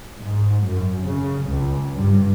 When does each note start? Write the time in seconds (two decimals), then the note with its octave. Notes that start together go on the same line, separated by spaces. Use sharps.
0.19 G#2
0.66 F#2
1.03 C#3
1.48 C#2
1.94 G2